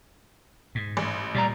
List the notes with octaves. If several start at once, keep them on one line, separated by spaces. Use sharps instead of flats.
G#2
A1
A#2 G3 D5 A#5